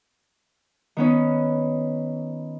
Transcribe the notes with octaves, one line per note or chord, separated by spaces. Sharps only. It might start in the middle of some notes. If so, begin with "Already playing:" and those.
D#3 B3 C#4